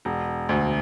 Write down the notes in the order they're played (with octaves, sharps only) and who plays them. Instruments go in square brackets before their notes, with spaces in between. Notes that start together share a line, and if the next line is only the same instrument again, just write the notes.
[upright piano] E1
D2